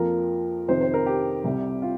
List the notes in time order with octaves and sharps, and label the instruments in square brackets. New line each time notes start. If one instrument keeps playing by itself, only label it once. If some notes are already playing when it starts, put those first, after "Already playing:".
Already playing: [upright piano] F2 F3 A#3 A#4
F2 C3 D#3 C5
C5
A#4
G4
C2 C3 G3
F4